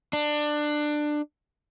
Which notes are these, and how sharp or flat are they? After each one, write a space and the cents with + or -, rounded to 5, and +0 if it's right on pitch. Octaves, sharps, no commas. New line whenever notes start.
D4 +20